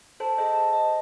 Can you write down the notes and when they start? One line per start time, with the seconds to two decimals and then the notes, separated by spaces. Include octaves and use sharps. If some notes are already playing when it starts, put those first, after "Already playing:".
0.20 A4 C5 A5
0.38 G#4 A4 C5 D#5
0.53 A5
0.73 D#5